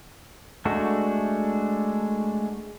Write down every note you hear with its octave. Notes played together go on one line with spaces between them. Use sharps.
G#3 A3 D4 F#4